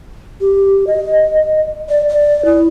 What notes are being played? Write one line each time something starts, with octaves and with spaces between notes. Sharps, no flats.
G4
D#5
D5
D5
E4